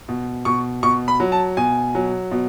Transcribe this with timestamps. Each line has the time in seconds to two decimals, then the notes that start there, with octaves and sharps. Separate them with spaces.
0.09 B2
0.45 B2 C#6
0.83 B2 C#6
1.08 B5
1.20 F#3
1.32 A5
1.57 B2 G#5
1.95 F#3
2.31 B2